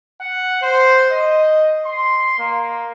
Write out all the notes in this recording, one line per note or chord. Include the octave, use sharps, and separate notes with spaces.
F#5
C5
D#5
C6
A#3